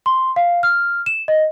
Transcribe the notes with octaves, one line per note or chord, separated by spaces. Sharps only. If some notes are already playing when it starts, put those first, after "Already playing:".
C6
F5
F6
E7
D#5